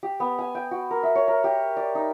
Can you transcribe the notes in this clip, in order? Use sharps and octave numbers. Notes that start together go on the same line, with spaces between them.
G4
B3
G#5
G5
F#4
A#4
E5
C#5
A#4
G4
D5
D#4